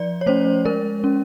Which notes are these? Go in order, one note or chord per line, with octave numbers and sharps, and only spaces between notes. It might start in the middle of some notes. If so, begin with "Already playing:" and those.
Already playing: F3 D5
C#5
A3 C#4 C5
G#3 A#4
C#4